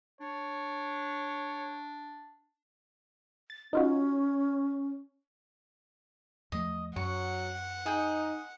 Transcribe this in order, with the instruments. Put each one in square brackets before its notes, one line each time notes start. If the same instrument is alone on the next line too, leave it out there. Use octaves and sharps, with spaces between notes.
[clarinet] D4 [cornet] C#5
[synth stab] A6
[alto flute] C#4 [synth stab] D#4 F4 F#4
[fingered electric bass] E2 F3 A3 [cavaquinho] D#5
[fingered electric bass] F#2 [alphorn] F#3 [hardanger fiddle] F#5 [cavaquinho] C#6
[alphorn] D#4 [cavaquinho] G#4 G5